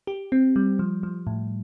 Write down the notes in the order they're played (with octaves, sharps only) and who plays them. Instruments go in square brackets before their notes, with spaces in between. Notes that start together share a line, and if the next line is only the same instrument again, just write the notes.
[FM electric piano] G4
C4
G3
F3
F3
A2